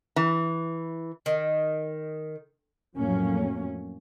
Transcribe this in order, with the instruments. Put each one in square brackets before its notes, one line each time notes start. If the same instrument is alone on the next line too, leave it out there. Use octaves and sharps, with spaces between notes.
[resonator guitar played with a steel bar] E3
[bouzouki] D#3
[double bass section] F2 A2 F#3 A3 A#3 C#4